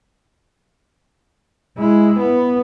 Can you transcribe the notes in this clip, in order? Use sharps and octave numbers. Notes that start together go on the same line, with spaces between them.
G#3 E4
B3